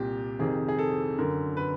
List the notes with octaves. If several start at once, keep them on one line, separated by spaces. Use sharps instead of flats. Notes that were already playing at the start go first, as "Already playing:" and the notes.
Already playing: C2 A#2 G4
F2 C3 D#3 G#4
G#4
A4
F#2 D3 A#4
B4